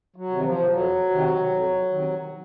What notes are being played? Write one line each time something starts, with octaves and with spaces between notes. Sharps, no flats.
F#3
C3 D#3
F3
F2 F#3
C3 D#3
F2
C3 D#3